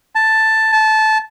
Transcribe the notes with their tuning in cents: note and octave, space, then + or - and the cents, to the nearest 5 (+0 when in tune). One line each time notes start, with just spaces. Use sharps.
A5 +5
A5 -15